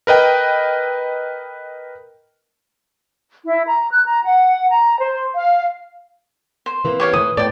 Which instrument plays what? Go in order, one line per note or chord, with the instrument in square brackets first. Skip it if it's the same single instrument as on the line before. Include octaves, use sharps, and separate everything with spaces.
[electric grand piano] A#4 B4 D#5 G5
[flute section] E4
A#5
F#6
A#5
F#5
A#5
C5
F5
[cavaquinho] C5
[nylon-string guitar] E3 A#3 C4
[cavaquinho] G4 C#5 F5
[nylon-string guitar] A2 E3 [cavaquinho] D#6
[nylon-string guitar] A2 [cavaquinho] D5 G5